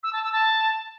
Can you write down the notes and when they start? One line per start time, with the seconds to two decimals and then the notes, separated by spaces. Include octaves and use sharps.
0.03 E6
0.13 A5
0.23 E6
0.33 A5